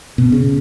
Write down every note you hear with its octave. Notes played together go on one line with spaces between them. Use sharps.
B2
C#3